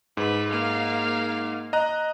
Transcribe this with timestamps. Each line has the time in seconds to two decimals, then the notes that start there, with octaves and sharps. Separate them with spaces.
0.17 G#2 B4
0.50 A#3 F5
1.73 D#5 A#5 F#6